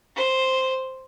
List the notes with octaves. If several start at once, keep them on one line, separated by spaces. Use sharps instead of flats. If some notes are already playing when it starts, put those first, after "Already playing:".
C5